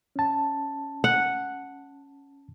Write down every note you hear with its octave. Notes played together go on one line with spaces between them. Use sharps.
C#4 A5
F#5